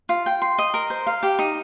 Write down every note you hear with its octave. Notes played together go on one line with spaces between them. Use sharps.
F4
G5
C6
D#5
A#4
C5
F5
G4
D#4